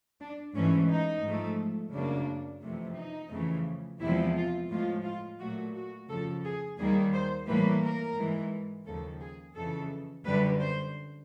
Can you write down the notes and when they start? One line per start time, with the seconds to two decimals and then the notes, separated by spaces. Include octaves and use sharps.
0.20 D4
0.55 G#2 E3 A3 C#4
0.89 D#4
1.24 G#2 F3 A3
1.93 F#2 C#3 F#3 A#3 D4
2.63 F2 C3 E3 A3
2.97 D#4
3.32 F2 C#3 E3 A3
4.01 E2 C3 F3 G#3 E4
4.36 F4
4.71 A2 F3 G#3 F4
5.05 F4
5.40 A#2 F#3 A3 F#4
5.75 F#4
6.09 F2 C#3 F3 A4
6.44 G#4
6.79 D#2 D#3 G3 A#3 G#4
7.14 C5
7.48 A2 E3 G3 A#3 B4
7.83 A#4
8.17 G#2 E3 G#3
8.87 D#2 C#3 F3 A4
9.21 G#4
9.56 F2 C#3 E3 A4
10.25 F#2 D3 G3 B4
10.60 C5